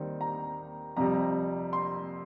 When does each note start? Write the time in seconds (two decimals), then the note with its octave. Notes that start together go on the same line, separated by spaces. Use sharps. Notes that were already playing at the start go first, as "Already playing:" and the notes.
Already playing: D#2 D#3 G3 C4 D#4
0.21 A#5
0.97 F2 C3 G3 A#5
1.73 C6